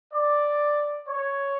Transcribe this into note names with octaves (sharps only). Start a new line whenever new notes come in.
D5
C#5